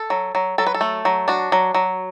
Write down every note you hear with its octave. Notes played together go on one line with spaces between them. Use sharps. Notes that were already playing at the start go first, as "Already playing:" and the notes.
Already playing: A4
F#3
F#3
F#3 A4
B4
A4
A3
F#3
D4 F#4
F#3
F#3